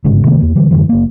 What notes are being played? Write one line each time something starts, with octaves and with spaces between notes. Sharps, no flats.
G1 G#2 C#3
C3 D#3 A3 A#3
E2 A#3
D3 E3 G3
F#2 D3 E3 G3
F#1 A#3